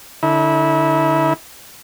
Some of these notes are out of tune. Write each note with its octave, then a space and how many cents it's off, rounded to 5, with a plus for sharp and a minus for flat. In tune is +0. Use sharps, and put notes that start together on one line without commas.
D3 +0 E4 -30